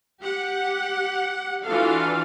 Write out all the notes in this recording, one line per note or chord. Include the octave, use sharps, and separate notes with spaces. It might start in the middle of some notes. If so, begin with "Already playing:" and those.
G4 F#5
E3 D4 F4 F#4 A4 F5